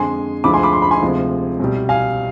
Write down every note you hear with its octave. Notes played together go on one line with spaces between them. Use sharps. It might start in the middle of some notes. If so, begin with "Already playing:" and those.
Already playing: F2 D3 G#3 G#5 C6
D2 D3 F3 G#3 B5 D6
G#5 C6
B5 D6
C6
B5
G#5 C6
D2 C3 F3 G#3
C2 B2 G3
F5 G#5